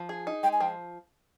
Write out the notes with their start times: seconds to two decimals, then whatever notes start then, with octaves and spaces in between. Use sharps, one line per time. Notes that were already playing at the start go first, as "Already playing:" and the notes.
Already playing: F3
0.09 G#4
0.27 D#4
0.43 G#3 G5
0.53 G#5
0.60 F3 G5